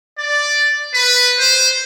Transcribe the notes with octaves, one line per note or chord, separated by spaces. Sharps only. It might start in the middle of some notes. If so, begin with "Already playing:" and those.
D5
B4
C5